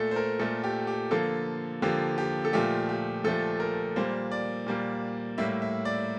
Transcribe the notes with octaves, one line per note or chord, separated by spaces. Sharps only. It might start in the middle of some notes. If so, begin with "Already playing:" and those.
Already playing: A#2 A3 A4
C5
A#4
A#2 A3 A4
G4
G4
D3 F3 A#3 A4
D3 F3 A#3 G4
G4
A4
A#2 F3 A3 G4
G4
A#2 F3 A3 A4
A#4
A#2 G3 A#3 C5
D5
A#2 G3 A#3
A2 G3 A#3 E5
E5
D5